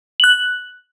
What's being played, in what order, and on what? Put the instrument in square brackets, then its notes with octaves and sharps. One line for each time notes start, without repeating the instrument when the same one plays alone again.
[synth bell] F#6 F#7